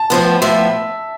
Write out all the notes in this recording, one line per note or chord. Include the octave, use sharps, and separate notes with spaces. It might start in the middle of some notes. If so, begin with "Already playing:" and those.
Already playing: A5
A2 F3 B3
A2 F3 B3 E5